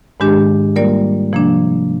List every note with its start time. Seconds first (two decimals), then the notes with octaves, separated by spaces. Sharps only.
0.20 G#2 D#3 G#3 D4 G4
0.76 G3 A#3 F4 A#4 D5
1.33 C3 F3 A#3 D4